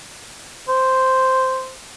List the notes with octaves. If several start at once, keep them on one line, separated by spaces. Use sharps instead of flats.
C5